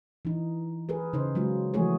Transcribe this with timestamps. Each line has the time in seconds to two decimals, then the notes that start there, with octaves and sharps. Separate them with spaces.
0.25 E3 D#4
0.89 G#4 A#4 B4
1.13 C#3 D#4 C5
1.35 F#3 G#3 F4
1.74 E3 F3 A3 F#4 G#4 C#5